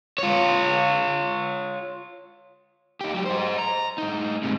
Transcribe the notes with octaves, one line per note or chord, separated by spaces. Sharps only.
F4 C#5
D#4 G4
F#3 G4
C5 D#5
A#5
A2 D#4
G#2 C3